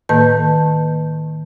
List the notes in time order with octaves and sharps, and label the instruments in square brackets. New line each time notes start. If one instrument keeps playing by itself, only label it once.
[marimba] A2 D#3 A#3 B4 A5 G6